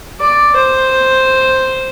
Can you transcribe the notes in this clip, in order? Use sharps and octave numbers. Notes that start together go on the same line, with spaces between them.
D5
C5